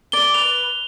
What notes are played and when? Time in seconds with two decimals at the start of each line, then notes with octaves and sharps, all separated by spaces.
0.12 D5 G7
0.34 B4 F7